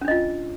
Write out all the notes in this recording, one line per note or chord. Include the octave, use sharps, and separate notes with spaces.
C#4 D4 F4 D#5